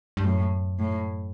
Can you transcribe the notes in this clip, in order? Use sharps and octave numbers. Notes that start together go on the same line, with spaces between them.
G2
F#2 A2
A2